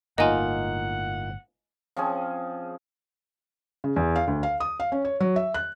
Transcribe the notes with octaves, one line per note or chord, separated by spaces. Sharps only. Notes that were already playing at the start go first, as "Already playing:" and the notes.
G1 A2 A#3 D#4 F4 D#5 F#5 G#5
F3 C4 C#4 G#4
C#3
E2
F5
D2
F5
D#6
F5
C#4
C#5
F#3
E5
F#6